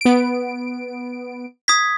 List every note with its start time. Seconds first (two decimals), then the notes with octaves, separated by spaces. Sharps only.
0.01 B3 D7
1.68 D#6 G#6 B6